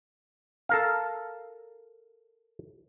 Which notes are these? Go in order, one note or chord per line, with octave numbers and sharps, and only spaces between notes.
A4 A#4 F5